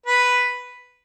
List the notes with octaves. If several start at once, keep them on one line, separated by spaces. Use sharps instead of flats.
B4